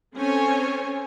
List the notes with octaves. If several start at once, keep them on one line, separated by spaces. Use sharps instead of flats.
C4 C#4 A4 C5 C#5 G#5